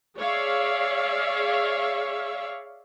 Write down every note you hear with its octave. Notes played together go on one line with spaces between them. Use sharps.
G#4 C#5 D5 E5 F5